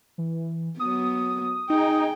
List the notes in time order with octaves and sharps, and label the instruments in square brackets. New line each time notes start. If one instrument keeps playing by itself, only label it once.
[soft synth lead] E3
[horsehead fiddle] F#3 B3 [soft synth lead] D#6
[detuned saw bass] D#4 [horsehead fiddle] G#4 G5